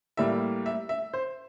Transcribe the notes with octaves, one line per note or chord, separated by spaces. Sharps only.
A2 G3 A#3 E5
E5
E5
C5